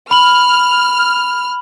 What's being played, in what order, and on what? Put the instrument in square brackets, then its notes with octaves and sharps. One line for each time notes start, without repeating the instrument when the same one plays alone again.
[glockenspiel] B5 F#7 [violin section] F6